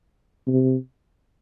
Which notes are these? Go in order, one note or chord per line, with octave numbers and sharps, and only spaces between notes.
C3